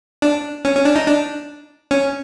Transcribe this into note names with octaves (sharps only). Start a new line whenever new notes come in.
D4
C#4
C#4
D4
D#4
D4
C#4